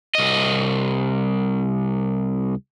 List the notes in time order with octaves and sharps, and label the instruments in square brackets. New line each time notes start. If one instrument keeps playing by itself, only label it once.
[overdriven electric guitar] C2 D#5